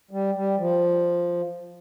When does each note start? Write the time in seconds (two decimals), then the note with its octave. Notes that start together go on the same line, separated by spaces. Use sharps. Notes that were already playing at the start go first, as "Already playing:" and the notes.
0.11 G3
0.35 G3
0.58 F3